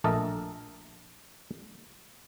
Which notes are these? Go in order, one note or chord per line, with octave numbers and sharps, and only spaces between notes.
A#1 A3 A4 A#4 D#5